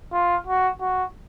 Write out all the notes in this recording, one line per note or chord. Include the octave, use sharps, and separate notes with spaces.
F4
F#4
F#4